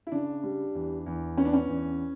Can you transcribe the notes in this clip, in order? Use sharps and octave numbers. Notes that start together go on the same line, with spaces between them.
E4
C#3 D4
G3
E2
E2
B3 C#4
D4
C#4
E2